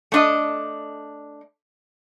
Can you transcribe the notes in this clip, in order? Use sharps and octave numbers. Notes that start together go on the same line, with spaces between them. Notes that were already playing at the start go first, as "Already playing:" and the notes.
A3 D4 D#5